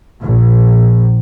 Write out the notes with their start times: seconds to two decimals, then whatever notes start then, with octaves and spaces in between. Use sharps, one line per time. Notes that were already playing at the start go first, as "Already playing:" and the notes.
0.22 A#1